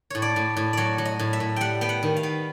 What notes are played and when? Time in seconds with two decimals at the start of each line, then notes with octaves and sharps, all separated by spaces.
0.10 A2 C#5
0.22 D5
0.36 A2
0.57 A2
0.73 F#3 C#5 D5
0.98 F#3
1.05 D#5
1.19 A2
1.33 E5
1.40 A2
1.56 G3 F#5 G5
1.81 B3 G5
1.89 F#5
2.03 D#3
2.16 F5
2.23 B3